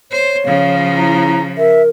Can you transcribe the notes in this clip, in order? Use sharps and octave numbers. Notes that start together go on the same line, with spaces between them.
C5 C#5
C#3 F3 F5
E4 A#5
A#4 E5